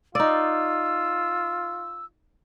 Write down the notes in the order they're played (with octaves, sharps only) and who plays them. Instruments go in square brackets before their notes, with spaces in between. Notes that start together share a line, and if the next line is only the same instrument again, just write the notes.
[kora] D#4 D5 [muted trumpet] F4 [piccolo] E6